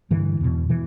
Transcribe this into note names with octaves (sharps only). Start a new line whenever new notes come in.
G2 D3 E3
E2 B2
B2 E3